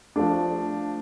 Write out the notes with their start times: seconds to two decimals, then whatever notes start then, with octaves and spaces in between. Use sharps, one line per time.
0.16 F3 A3 D4